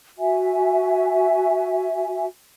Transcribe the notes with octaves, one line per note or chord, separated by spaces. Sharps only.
F#4 E5 G#5